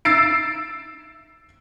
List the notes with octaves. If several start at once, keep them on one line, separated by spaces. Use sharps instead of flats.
E6 A6 C7 D7